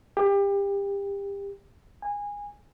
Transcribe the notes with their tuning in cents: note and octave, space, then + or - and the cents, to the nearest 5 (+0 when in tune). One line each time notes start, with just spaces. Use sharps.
G4 +30
G#5 -20